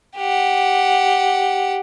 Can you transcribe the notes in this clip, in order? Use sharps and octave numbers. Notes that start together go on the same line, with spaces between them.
G4 F#5